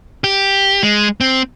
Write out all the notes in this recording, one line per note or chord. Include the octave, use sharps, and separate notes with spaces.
G4
G#3
C4